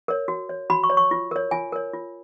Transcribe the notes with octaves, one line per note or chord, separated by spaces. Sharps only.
A#4 C#5
F#4
C#5
F#4 B5
C#6
C#5
C#6
F4
A#4 C#5
F4 G#5
A#4 C#5
F4